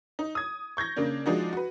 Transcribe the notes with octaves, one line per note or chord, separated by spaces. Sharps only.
D#4
D#6 G#6
C#6 G6 G#6 A#6
C#3 A#3 D4
F3 G#3 D4 D#4 F#4
F#4 B4